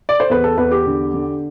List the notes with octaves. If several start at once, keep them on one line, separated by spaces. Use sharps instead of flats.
D5
C5
E2 B4
A4
E2 B4
G4
D3
D3